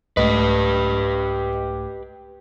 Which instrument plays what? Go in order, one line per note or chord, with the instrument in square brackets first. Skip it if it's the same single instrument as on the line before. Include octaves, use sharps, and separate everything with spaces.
[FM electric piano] C2 G#2 A3 [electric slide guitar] G4 B4 [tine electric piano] D#5